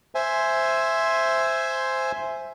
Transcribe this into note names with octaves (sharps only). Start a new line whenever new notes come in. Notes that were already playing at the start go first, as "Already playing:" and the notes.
C5 E5 G#5